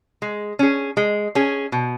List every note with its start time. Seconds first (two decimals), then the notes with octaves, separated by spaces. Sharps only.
0.22 G#3
0.59 C#4 G#4
0.97 G#3
1.35 C#4 G#4
1.72 B2